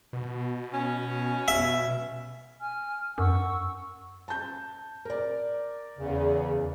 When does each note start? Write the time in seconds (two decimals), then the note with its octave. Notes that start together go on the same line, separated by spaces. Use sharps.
0.13 B2
0.73 C#4
1.48 E5
2.60 G#5 F6
3.18 F#2 F#5 C#6 E6
4.28 A5 G6
5.05 A#4 D5
5.98 E2 C#3